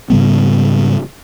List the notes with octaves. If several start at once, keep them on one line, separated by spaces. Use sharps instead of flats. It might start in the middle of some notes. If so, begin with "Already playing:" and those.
G#2 C#3 G3 B3